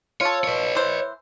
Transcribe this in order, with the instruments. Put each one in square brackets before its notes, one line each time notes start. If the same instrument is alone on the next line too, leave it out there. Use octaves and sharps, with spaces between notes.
[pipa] F4 A4 [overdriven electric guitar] C#5
[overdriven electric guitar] B4 C#5
[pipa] E3 C5